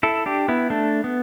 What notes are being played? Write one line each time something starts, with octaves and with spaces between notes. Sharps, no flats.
E4 A4
D4 G4
B3 E4
A3 D4
B3